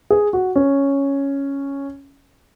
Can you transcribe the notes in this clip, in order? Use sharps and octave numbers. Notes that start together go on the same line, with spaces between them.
G#4
F#4
C#4